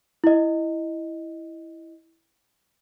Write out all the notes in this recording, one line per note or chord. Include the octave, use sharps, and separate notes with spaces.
E4 D#5